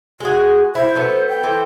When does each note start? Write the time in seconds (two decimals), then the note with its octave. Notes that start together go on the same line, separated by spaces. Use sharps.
0.20 G#3 F#4 G#4
0.75 E4 C5
0.95 F#3 A3 B3
1.29 G5
1.43 E3 A4 C5